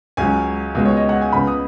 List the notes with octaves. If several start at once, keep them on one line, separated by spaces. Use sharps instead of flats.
C#2 C#3 F#3 C#4 G#5
C#2 B2 G#3
C#5
D#5
F#5
G#5
C#2 C#3 B3 B5
D#6